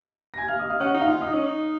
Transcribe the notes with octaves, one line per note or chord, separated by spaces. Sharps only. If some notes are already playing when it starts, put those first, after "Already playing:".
A#6
G#5 G#6
F5 F6
D#5 D#6
F5 F6
C#4 F#5 F#6
D#4
F5 F6
F4
D#4 D#5 D#6
C#4
D#4